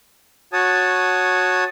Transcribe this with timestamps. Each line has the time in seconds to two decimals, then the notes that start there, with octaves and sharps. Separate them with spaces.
0.53 F#4 C#5 A5 D#6